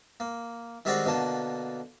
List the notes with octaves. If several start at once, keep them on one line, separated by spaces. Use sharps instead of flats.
A#3
D#3 G3 G#3 C4 F#4 D5
B2 D3 A#3 A5